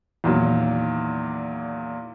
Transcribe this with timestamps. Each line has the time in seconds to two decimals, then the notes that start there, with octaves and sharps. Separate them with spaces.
0.24 E2 A#2 D#3 F#3